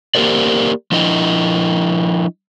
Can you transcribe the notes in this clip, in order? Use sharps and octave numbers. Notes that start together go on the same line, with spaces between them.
A#3 G4 A#4 C5 D5
F3 D4 E4 D#5